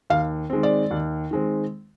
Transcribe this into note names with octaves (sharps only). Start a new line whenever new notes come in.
D#2 F5
D#3 G#3 C4
D5
D#2
D#3 G#3 C4